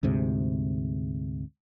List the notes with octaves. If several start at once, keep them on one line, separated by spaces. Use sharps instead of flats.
D2 G#2 C3